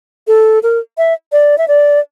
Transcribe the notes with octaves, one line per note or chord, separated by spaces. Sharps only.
A4
A#4
E5
D5
E5
D5